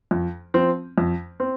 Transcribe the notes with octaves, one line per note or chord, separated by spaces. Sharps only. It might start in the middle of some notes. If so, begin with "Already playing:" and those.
F2
F3 C4
F2
C4